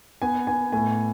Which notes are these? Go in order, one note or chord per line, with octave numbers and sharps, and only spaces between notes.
B3 G#5
B3 G#5
A2 G#5